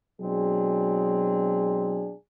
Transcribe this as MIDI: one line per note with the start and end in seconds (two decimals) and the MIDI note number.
0.21 2.13 47
0.21 2.13 54
0.21 2.13 56
0.21 2.13 60
0.21 2.13 62
0.21 2.13 68